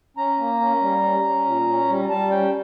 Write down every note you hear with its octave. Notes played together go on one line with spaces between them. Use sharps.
C#4 A#5
A#3
C#4
G3
C#4
C#4
A#2
C#4
G3
G3 A5
C#4 G5